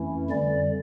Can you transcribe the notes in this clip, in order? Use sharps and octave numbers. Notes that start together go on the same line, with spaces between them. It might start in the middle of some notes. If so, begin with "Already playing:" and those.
Already playing: F2 E3 A3 C#4 E4
F2 D3 G3 D5